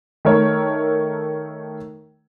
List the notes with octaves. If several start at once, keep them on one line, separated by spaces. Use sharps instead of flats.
D#3 A3 A#4 C#5